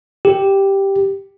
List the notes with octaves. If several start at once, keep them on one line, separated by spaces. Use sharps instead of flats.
G4